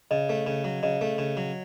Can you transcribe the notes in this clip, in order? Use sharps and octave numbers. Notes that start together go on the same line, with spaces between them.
C#3 D#5
A3
C#3
F#3
C#3 D#5
A3
C#3
F#3